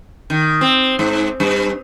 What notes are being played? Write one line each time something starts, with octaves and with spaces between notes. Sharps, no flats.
D#3
C4
G#2
G2